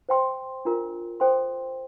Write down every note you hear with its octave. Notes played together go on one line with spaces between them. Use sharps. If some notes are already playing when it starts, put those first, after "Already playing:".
C5 G5 C6
D4 F4 A#4
A4 C5 G5 C6